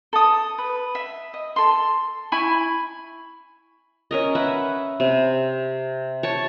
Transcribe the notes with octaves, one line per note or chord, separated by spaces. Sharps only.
A4 D#6
B4
E5
D#5
A4 C6
E4 G#5 B5 C#6
C#4 A#4 D#5
B4 E5 F#5
C3
C#5 A5